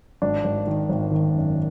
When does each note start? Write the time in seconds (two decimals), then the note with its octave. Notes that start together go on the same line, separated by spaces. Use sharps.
0.22 G#1 D4
0.44 G#1
0.67 D#3
0.89 G#1
1.11 D#3
1.34 F#2